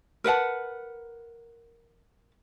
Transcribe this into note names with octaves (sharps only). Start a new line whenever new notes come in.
A#4 B4 F#5 A5